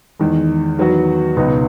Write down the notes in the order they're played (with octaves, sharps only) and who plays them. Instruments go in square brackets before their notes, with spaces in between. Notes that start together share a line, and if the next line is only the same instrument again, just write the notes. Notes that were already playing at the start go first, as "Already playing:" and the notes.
[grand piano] E2 D#3 G#3
E2 D#3 F#3 B3 F#4
C#2 B2 F#3 B3 D#4